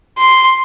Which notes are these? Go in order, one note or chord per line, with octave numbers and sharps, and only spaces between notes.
C6